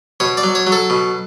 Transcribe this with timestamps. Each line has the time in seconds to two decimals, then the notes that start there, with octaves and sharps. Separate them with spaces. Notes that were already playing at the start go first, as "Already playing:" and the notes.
0.20 B2 C#5
0.37 D5
0.43 F#3
0.55 C#5
0.67 F#3
0.72 A4
0.90 B2